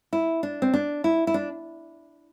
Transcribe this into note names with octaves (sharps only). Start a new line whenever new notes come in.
E4
D4
C4
D4
E4
E4
D4